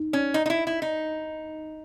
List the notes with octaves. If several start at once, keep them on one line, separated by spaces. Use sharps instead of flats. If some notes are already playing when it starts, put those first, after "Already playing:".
Already playing: D#4
C#4
D#4
D#4
E4
E4
D#4